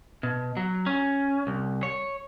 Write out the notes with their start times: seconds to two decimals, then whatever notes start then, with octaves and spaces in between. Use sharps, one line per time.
0.23 B2
0.57 F#3
0.86 C#4
1.47 C2
1.83 C#5